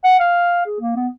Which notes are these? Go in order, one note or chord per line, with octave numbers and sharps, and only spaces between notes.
F#5
F5
G#4
A#3
B3